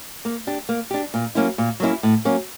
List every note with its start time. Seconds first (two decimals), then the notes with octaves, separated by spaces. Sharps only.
0.25 A#3
0.47 D4 G4
0.69 A#3
0.91 D4 G4
1.14 A#2
1.35 F#3 A#3 C#4 E4
1.58 A#2
1.80 F#3 A#3 C#4 E4
2.03 A2
2.25 F#3 A#3 C#4